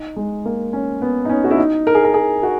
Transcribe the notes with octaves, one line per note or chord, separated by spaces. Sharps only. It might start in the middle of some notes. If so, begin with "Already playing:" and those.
Already playing: D#4
G#3
A#3
C#4
B3
D#4
C#4
F#4
E4
D#4
A#4
G#4
A#4
G#4
F#4